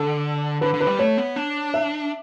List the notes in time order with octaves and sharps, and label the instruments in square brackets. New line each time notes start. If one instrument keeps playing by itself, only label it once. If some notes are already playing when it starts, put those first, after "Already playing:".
Already playing: [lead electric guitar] D3 [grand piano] A4
[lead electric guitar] D3 [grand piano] B4
[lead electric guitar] D3
[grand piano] B4
[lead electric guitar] G3
[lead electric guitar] A3 [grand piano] C#5
[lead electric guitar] B3
D4
[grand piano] E5